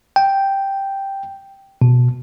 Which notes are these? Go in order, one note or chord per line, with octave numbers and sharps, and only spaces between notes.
G5
B2